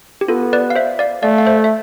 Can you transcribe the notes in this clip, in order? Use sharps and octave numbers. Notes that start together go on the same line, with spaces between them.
G4
B3 F4 A4
B4 D5
F5
C5 E5
D5 F5
A3 D5 F5
F5
C5 E5
E5